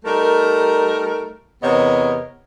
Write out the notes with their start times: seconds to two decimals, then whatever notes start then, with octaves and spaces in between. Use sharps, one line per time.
0.05 G3 A3 D#4 A#4
1.63 E2 C3 B3 A#4 C#5 D#5